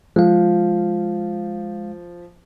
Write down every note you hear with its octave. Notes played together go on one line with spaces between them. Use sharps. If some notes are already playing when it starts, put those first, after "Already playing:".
F3 G#3 F5